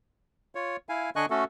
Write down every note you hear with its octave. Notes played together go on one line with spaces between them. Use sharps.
F4 C#5
E4 F5 G#5
D3 D4 D#5 G#5 C#6 F#6
A3 C#4 F#4 A4